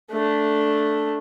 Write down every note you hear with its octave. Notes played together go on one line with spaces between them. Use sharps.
A3 D4